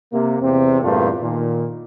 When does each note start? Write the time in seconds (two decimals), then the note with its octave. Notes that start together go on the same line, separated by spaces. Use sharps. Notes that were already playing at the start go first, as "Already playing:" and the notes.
0.12 C3 A#3
0.42 E2 C3 C4
0.83 E2 G2 A#2 A3 F4
1.21 A#2 D#3